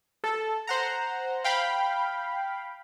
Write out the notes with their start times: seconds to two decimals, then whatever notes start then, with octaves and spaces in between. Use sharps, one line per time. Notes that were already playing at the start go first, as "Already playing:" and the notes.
0.24 A4
0.67 C5 F#5 A#5
1.44 F5 G5 B5